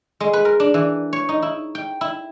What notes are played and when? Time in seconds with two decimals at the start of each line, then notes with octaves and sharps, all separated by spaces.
0.20 G#3
0.33 B4
0.45 A#4
0.60 D4
0.74 E3
1.13 C#5
1.29 D#4
1.42 E4
1.75 G5
2.01 E4